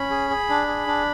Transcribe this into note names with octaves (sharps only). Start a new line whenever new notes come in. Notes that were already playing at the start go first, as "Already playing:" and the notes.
Already playing: C#4 B5
G#4
G#4
D4
G#4
D4